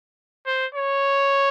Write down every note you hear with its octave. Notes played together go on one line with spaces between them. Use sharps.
C5
C#5